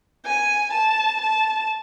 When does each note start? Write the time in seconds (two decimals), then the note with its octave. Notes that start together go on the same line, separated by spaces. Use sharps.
0.26 G#5
0.73 A5
1.21 A5